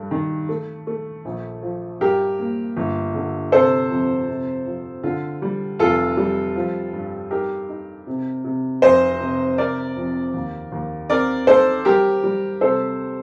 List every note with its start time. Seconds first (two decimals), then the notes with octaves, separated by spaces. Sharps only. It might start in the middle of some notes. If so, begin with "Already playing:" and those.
Already playing: G2 A3
0.11 D#3
0.49 A3
0.87 A3
1.25 A#1
1.63 F3
2.00 G2 G4 A#4
2.38 A#3
2.77 G1
3.15 D3
3.52 C3 A4 C5
3.90 F2
4.28 C3
4.66 F3
5.03 D3 F4
5.42 G3
5.79 F1 F4 A4
6.17 G3
6.56 F3
6.93 G2
7.31 D#4 G4 A#4
7.69 D#4
8.07 C3
8.44 C3
8.82 F1 C5 D#5
9.20 C3
9.58 C3 A#4 D5
9.97 F2
10.34 D#2
10.72 D#2
11.10 C4 A#4 D5
11.47 D#4 A4 C5
11.85 G3 G4 A#4
12.24 G3
12.61 C3 A4 C5